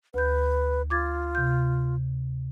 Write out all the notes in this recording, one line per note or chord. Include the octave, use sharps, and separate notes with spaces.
D2 B4 G6
F4 D6 G#6 A6
C3 G6